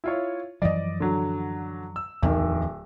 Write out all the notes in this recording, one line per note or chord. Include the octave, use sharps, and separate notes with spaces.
E4 F4 C#5
F#2 E3 F3 D5 D#5
D3 F#3
E6
D1 E2 D#3